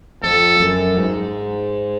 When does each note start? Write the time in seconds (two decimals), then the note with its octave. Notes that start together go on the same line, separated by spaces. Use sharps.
0.23 F2 A4
0.60 F#2
0.97 G#2